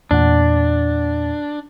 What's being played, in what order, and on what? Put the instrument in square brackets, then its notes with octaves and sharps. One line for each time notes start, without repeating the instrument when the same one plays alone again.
[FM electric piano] E2 A#2 F#5 [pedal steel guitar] D4